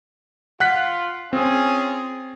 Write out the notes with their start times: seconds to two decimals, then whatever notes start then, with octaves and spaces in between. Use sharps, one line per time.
0.60 F4 F#5 F#6 B6
1.33 C4 C#4 F4 G#4